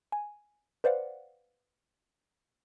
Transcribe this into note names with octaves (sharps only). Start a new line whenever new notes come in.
G#5
B4 C5 D5 F5 F#5